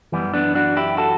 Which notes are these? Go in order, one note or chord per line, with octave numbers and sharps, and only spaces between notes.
F#2 E3 G3 B3
B3 D4
D4 F#4
E4 G4
F#4 A4